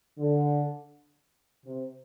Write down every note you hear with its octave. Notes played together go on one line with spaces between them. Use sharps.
D3
C3